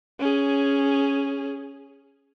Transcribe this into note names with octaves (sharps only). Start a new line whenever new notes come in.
C#4 G#4